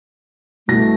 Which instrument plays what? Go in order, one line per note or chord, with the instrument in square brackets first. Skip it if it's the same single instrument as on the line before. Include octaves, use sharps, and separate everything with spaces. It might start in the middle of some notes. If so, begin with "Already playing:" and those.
[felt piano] C2 B2 A#6 [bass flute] A3